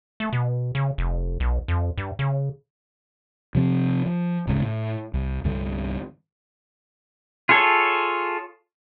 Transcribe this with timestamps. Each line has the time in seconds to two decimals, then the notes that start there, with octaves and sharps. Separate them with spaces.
0.20 A3
0.33 B2
0.75 C#3
0.98 F1
1.40 B1
1.68 F2
1.97 G2
2.19 C#3
3.55 C3 F3 C4
4.06 F3
4.47 D1 G1 G#2 C#3
4.62 A2
5.14 C2
5.44 C2 G2 D3
7.49 F4 G#4 A4 C#5